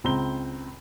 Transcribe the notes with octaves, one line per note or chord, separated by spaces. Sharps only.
C#2 C4 A#5 G7